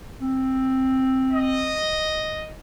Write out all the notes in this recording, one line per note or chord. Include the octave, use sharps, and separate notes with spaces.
C4
D#5